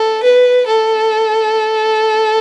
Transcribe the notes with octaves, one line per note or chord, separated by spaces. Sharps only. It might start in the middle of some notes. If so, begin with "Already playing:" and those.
Already playing: A4
B4
A4